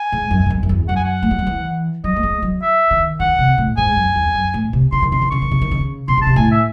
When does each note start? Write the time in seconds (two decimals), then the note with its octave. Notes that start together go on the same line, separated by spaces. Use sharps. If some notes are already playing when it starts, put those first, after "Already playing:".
Already playing: G#5
0.12 G#2
0.31 F#2
0.46 G#2
0.50 F#2
0.63 F#2
0.69 E2
0.88 F#2 F#5
0.96 G#5
1.04 F#5
1.23 A3
1.31 G#3
1.39 F#3
1.47 E3
2.04 F#3 D#5
2.16 A3
2.23 G#3
2.42 F#3
2.62 E5
2.91 D#3
3.20 D#3 F#5
3.39 C3
3.58 A2
3.77 G#2 G#5
3.96 F#2
4.16 E2
4.35 F#2
4.54 A2
4.73 C3
4.92 C#3 C6
5.02 D#3
5.12 C#3 C6
5.22 D#3
5.31 C#3 C#6
5.42 D#3
5.51 C#3
5.62 D#3
5.71 C#3
6.08 C3 C6
6.17 C#3
6.22 C3 A5
6.36 A2 G#5
6.52 E5